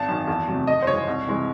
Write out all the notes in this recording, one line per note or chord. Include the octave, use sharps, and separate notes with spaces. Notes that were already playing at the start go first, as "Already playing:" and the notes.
Already playing: G#1 A5
F#2 D#3
E2
C3 F#3 A3
F#1 D#5
C5
F#2 C#3 E3 G#3 C#5
C2
C3 E3 G#3